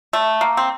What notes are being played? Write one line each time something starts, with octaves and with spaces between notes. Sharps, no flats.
A3
A#3
C4